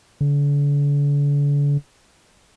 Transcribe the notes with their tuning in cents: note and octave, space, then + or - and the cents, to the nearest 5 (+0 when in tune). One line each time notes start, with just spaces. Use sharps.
D3 -40